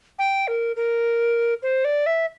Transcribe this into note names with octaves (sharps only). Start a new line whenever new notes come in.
G5
A#4
A#4
C5
D5
E5